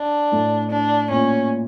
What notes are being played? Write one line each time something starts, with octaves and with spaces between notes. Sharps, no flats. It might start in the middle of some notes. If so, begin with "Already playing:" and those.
Already playing: D4
A2
D4
A#2 C#4